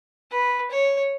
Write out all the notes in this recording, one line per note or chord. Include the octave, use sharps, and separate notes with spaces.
B4
C#5